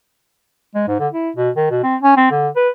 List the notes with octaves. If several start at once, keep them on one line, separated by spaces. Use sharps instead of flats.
G#3
G#2
D3
E4
B2
D#3
B2
C4
C#4
C4
D3
B4